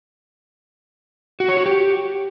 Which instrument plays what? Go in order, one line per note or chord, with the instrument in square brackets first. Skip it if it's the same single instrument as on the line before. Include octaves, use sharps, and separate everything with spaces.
[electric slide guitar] F#4
C#5
F#4
G4